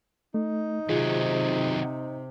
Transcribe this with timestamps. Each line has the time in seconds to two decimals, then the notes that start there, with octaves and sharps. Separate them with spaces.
0.34 A3 D#4
0.89 C3 D#3 F#3 C4 F4 G#4